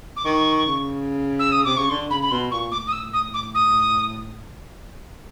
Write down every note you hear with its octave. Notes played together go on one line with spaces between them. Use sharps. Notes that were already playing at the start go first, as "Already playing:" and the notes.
D6
D#3 C#6
C#3
E6
D#6
C3 D6
C#3 C#6
D3 C6
C#3 B5
B5
B2 C6
A#2 C#6
A2 D6
D#6
E6
D#6
D6
D#6